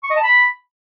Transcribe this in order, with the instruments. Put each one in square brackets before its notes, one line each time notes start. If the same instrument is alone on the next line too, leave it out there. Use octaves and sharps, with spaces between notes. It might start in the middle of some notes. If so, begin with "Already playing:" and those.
[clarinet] C#6
D#5
A5
B5